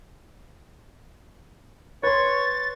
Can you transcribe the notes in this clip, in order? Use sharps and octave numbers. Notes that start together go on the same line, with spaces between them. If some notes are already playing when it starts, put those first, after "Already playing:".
B4 C#5 C6 A6